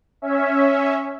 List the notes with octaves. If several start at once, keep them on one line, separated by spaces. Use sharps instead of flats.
C#4 E5